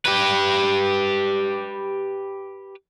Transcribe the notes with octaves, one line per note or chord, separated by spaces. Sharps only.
G4 B4